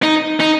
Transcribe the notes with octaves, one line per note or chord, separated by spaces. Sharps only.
D#4
D#4